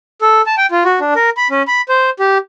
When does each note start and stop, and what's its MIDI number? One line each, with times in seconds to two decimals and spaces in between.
0.22 0.42 69
0.46 0.55 81
0.58 0.66 79
0.71 0.83 65
0.85 0.99 66
1.00 1.14 62
1.16 1.30 70
1.37 1.48 83
1.51 1.62 61
1.67 1.82 83
1.89 2.10 72
2.20 2.38 67